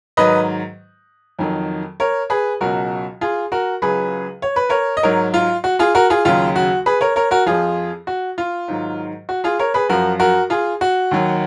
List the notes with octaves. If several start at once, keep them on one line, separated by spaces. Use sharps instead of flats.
G#2 D#3 F#3 B4 D#5
F2 D#3 F#3
A#4 C#5
G#4 B4
C#2 B2 F#3 F#4 A#4
F4 G#4
F#4 A#4
C#2 C#3 F#3 G#4 B4
C#5
B4
A#4 C#5
D#5
G#2 F#3 A#4 C#5
F4
F#4
F4 G#4
F#4 A#4
F4 G#4
D#2 C#3 F#3 F4
F#4
G#4 B4
A#4 C#5
A#4 C#5
F#4 A#4
F2 F3 F4 G#4
F#4
F4
G#2 D#3 F#3
F#4
F4 G#4
A#4 C#5
G#4 B4
F#2 F3 F#4 A#4
F#4 A#4
F4 G#4
F#4
D#2 D#3 F#3